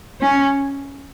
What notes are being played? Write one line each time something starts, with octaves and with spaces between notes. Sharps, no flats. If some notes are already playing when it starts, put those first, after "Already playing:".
C#4